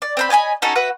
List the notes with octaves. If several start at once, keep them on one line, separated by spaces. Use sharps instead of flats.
D5
C4 C5 B5
C#5 D#5 G#5 B5
C#4 D#4 F#4 A4
F#4 B4 E5 F#5